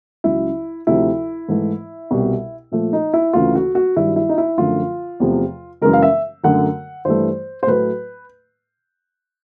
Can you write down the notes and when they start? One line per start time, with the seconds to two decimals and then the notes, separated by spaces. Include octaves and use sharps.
0.24 C#2 C#3 F#3 E4
0.87 D2 C3 F3 E4
1.49 G#2 E3 A3
2.11 C2 B2 G3
2.72 A#2 F3 A3
2.93 D#4
3.14 E4
3.33 D2 C#3 E3 F4
3.55 F#4
3.75 F#4
3.96 G2 D#3 F#3 E4
4.16 E4
4.29 D#4
4.38 E4
4.58 F#2 D3 F3 A3 F4
5.20 E2 C3 F3 A3
5.82 F#2 C#3 E3 G#3 A#4
5.93 F5
6.03 E5
6.43 F#2 D3 F#3 A3 F#5
7.05 G2 E3 A3 C5
7.63 C5
7.67 A2 F#3 A3 B4